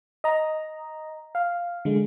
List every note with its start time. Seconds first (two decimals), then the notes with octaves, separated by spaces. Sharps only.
0.24 D#5 A#5
1.35 F5
1.85 D3 G#3